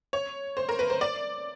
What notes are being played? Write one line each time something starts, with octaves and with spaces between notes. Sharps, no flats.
C#5
C5
A#4
B4
C5
D5